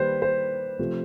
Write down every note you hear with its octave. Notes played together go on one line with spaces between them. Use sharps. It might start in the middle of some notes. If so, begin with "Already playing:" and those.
Already playing: D#3 G3 A#3 B4 C5
C5
C3 F3 A3